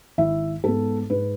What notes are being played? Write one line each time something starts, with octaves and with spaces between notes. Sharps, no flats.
G#1 E4 E5
G#2 G#3 B3 A4
G#2 B4